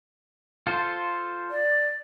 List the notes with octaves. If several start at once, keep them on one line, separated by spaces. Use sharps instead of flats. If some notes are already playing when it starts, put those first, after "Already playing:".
F4 A4 C5
D5